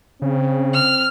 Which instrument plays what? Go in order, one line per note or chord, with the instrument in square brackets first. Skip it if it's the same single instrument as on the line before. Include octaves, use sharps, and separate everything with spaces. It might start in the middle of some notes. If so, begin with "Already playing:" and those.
[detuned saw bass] C#3 [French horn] C4
[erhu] F6